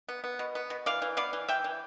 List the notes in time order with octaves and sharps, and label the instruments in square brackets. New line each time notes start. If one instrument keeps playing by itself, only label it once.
[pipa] B3
B3
B2
B3
B2
E3 D5 F5
E3
B3 D5 F5
E3
E3 E5 G5
E3